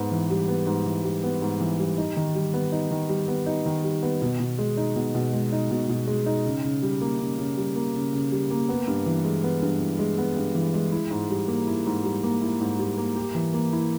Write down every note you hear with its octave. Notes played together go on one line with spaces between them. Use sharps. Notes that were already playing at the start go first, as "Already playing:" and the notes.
Already playing: G#2 B3
E3
G3
B3
G#2
E3
G3
B3
G#2
E3
G3
D#4
D#3
G3
B3
D#4
D#3
G3
B3
D#4
D#3
G3
B3
B2
B2
G#3
D#4
B2
B2
G#3
D#4
B2
B2
G#3
D#4
C#3
C#3
G3
A#3
C#3
C#3
G3
A#3
C#3
C#3
G3
A#3
B3
G2
E3
G#3
B3
G2
E3
G#3
B3
G2
E3
G#3
E4
G#2
G3
A#3
E4
G#2
G3
A#3
E4
G#2
G3
A#3
G4
E3
A#3
E4